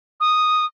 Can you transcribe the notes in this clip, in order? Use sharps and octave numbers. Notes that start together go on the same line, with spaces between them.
D#6